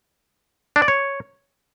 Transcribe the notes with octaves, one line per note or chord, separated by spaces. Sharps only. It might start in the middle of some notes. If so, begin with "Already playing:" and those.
D4
D5
C#5